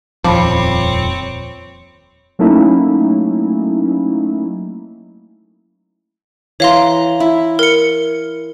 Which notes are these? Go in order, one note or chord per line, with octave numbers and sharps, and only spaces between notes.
D#1 F2 F3 C4 C#5 B5 D6
F#3 A3 A#3 C#4 D#4 E4
E3 C#5 F5 A#5 C6
E4
A#4 C#7